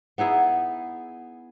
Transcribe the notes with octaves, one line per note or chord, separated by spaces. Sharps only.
B3 D#4 E4 G#4